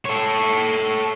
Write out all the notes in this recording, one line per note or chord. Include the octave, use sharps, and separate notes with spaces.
A4 C#5